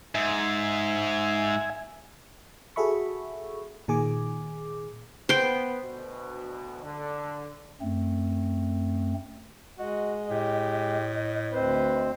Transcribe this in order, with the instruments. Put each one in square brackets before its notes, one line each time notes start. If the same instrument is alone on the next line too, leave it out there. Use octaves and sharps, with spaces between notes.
[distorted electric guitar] G#2 [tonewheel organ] E5 G#5
[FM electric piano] F#4 G#4 A4 E5 B5 C#6
A#2 D#3 G#4 G#5 D6
[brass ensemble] B3 [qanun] C5 G5
[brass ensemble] D2 B2
D3
[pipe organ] F#2 A3 C4
[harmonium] G#3 [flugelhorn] F#4 [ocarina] D#5
[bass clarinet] A2 [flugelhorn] G4
[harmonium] D2 C4 C5 [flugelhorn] B4